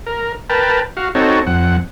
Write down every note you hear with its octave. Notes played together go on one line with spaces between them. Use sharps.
A#4
A#4 B4 G5 A5
F#4 F5
C4 D#4 F#4 A4 C#5
F2 F#5